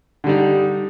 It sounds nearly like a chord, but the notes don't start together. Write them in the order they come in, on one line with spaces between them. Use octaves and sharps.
D3 G3 D#4